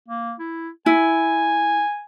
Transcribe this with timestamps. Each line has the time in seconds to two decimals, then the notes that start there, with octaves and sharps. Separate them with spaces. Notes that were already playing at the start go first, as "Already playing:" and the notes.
0.08 A#3
0.39 E4
0.86 E4 G#5